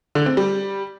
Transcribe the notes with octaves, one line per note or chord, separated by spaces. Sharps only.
D3
C4
G3